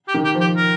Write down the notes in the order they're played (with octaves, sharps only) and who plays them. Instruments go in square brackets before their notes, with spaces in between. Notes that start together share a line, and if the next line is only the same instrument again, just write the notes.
[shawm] G4
[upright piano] D#3
[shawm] G4
[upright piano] F3
[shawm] G4
A#4